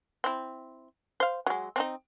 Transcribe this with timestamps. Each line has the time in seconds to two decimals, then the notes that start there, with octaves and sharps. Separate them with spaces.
0.24 C4 E4
1.20 C5 F5
1.46 F#3 G#3
1.76 C4 D4 D#4